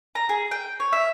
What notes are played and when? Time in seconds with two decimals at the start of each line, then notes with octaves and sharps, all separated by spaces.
0.15 A#5
0.29 G#4
0.51 G5
0.80 C#5
0.92 E5